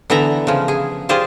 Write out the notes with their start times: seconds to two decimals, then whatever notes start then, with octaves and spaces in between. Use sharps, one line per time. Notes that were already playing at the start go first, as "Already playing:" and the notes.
0.10 D3 E3 B3 E5 A#5
0.47 C#3 F3
0.68 G#4
1.09 F4 G4 G#4 C5 D5